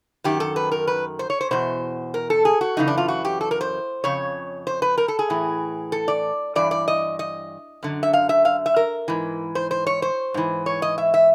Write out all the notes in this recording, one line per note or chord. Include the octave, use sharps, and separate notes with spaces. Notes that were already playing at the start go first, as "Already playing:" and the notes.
F#2 D#3 G4
A4
B4
A#4
B4
C5
C#5
C5
E2 B2 C5
A#4
A4
G#4
F#4
F#2 C#3 E3 D#4
D4
F4
F#4
G4
A4
A#4
C5
F2 C#3 C#5
C5
B4
A#4
A4
G#4
A2 E3
A4
D5
G2 E3 D5
D5
D#5
D#5
F#2 D3
E5
F5
E5
F5
E5
A#4
G#2 E3
C5
C5
C#5
C5
G#2 E3
C#5
D#5
E5
E5